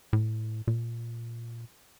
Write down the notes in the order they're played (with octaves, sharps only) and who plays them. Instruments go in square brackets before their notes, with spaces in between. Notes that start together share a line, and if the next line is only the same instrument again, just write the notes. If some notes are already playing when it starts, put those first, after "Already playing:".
[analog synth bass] A2
A#2